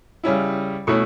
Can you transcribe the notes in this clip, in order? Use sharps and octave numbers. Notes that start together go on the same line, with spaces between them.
C#3 G3 C#4 E4
B2 A3 C#4 E4 C#6